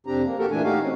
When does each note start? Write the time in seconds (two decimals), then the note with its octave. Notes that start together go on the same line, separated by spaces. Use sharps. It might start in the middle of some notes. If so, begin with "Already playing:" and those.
0.07 F2 C3 C4 D4 G4 A#5
0.23 A#3
0.39 A#3 F#4 G4 A4 A#4
0.51 A#2 E3 A3 D4 G#5
0.64 D#4 F#4 G4 F5
0.82 C4 C#4